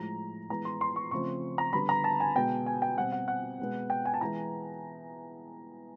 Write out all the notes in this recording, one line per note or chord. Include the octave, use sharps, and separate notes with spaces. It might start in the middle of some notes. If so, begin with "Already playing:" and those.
Already playing: A2 F3 G#3 A#5
E3 G#3 B3 A#5
C6
C6
C#6
C#3 F3 A3 C4 C#6
A#5
D3 G3 B3 B5
A#5
A5
G#5
B2 G#3 B3 G5
G#5
G5
B2 G3 C4 F#5
F#5
F#5
B2 G#3 B3
G5
G#5
A5
E3 G#3 B3 A#5